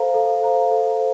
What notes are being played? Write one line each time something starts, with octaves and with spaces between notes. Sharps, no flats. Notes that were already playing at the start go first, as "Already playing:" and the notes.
Already playing: A4 C5 F5 A#5
A4
C5 F5 A#5
A4
C5